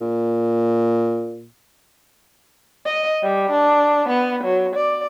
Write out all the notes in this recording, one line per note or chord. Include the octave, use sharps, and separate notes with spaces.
A#2
D#5
G3
D4
B3
F#3
D5